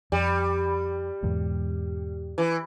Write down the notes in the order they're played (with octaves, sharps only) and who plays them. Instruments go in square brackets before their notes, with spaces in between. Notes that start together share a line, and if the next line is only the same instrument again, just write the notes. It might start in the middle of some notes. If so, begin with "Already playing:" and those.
[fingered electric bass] F2 [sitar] G3
[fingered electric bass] E2 G#2 B2
[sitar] E3